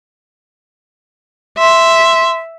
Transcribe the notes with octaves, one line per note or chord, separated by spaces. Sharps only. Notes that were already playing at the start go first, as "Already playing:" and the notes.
E5 C6